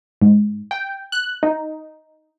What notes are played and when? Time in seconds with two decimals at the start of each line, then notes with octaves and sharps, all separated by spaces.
0.22 G#2
0.71 G5
1.12 F#6
1.43 D#4